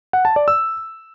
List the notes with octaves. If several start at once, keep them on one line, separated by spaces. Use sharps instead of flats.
F#5
A5
D5
E6